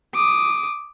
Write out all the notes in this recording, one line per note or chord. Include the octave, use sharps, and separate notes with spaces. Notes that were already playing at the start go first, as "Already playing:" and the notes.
D6 D#6